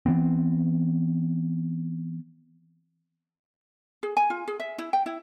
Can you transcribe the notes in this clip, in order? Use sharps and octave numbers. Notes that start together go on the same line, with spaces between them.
E3 F3 B3 C4
G#4
G#5
F4
G#4
E5
E4
G5
E4